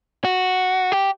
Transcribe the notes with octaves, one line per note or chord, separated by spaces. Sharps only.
F#4
G4